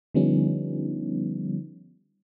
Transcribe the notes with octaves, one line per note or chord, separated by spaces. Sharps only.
D3 F3 G3 B3 C#4 D#4